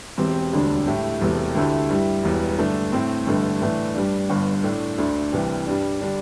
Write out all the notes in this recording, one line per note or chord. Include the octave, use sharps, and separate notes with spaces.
E1 E2 E3 C4 G4
E1 D2 D3 G3 D4
A2 A3 E4 G4
E1 E2 C3 A3
D2 D3 A3 E4 G4
G2 G3 E4 G4
E1 E2 E3 G3
G2 D3 A3 D4
A2 A3 C4
A1 G2 D3 A3
A2 E3 A3 D4
G2 G3 D4
G1 G2 D3
A2 A3 D4
D2 D3 A3 D4
C2 C3 E3 G3
G2 G3 D4
D3 G3 D4